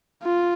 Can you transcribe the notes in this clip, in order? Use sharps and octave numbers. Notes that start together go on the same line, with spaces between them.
F4